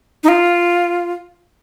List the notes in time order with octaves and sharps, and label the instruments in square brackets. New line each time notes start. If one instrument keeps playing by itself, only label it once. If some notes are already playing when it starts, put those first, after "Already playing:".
[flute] D#4
F4